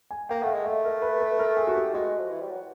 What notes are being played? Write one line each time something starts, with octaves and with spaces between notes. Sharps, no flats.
G#5
A#3 G5
A3 F5 F#5
G#3
A3 E5
A#4
B4
B4
A#4
G#4
F#4
G4
G#3 F#4
F3
E3
G3
F#3